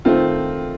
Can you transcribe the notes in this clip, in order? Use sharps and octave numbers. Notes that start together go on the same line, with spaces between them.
D#3 A3 C4 F4